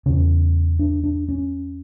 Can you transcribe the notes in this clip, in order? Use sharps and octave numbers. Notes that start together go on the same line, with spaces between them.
E2 C#3 C#4
D4
D4
C#4